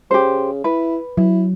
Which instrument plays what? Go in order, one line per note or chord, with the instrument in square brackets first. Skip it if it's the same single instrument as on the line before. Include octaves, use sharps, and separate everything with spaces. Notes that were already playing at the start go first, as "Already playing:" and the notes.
[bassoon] C#3 [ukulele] G4 C5
[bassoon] E4 [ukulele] B4
[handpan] F#3 [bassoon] E4